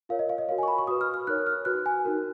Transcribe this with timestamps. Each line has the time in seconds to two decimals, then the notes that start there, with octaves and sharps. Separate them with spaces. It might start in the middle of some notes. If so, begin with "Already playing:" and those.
0.09 F4 A#4 C#5 F5
0.19 D#5
0.29 F5
0.38 D#5
0.48 F#4 A#4 C#5 F5
0.58 G#5
0.63 C#6
0.68 B5
0.78 C#6
0.87 F#4 B4 D#6
1.01 F6
1.14 F6
1.27 D#4 A#4 C#5 F#6
1.47 F6
1.65 F#4 B4 F#6
1.86 G#5
2.05 D#4 F#4 A#4